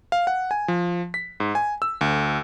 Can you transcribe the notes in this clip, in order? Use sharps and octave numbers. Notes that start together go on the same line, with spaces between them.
F5
F#5
G#5
F3
B6
G#2
G#5
E6
D2